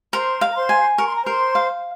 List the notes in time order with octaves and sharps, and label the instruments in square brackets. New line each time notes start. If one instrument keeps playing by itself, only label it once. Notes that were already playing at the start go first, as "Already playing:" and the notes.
[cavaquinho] A#4 [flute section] C5 C6
[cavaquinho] F5
[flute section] A#5
C5 C6
[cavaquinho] G#5
[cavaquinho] A#4 [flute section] C#6
[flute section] C6
A#5
[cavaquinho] A#4 [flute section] C5 C6
[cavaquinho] F5